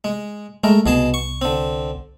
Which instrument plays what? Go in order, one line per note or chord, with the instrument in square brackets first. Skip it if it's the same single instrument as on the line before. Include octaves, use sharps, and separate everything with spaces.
[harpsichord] G#3
[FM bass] G#3 [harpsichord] A3 A#4
[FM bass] C2 [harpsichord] B2 G#4 A5
[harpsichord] C#6
D3 C4